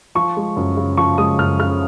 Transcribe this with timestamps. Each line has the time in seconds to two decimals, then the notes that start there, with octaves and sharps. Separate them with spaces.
0.15 F3 C#6
0.37 G#3
0.56 F#2
0.77 C#3
0.97 F3 C#6
1.18 G#3 D#6
1.38 F#2 F6
1.59 C#3 F6